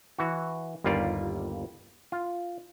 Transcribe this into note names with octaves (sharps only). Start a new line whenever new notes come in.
E3 F#4
G1 D#2 G3 A#3 F4 D5
F4